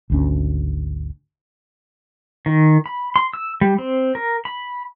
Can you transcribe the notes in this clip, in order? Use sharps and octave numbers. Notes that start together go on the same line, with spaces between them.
G#1 D2 C#4
D#3
B5
C6
E6
G3
C4
A#4
B5